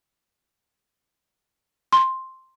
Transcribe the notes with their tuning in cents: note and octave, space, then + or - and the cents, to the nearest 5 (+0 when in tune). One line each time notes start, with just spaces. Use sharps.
C6 +5